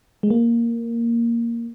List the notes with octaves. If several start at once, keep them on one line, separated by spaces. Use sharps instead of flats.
G#3
A#3